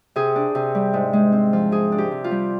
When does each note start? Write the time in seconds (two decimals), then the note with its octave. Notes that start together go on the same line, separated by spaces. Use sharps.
0.16 C3 G#4
0.36 D4
0.55 C3
0.75 G3
0.93 G#2
1.13 G#3
1.32 C4
1.53 F3
1.71 C3 G#4
1.92 D4
1.98 G4
2.11 C3
2.24 F4
2.31 G3